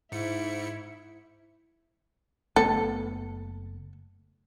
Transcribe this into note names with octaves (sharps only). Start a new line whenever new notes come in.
G#2 E4 C#7
F#1 A3 B3 A4